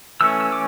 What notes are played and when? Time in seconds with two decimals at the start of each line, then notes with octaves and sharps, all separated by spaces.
0.21 E3 A3 C#4 E6
0.41 E6
0.52 D6